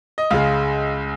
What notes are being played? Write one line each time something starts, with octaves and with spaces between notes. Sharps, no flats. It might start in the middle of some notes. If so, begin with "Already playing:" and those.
D#5
C#2 C#3 G#3 F5